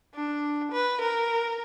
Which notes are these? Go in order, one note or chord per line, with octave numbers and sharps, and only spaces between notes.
D4
B4
A#4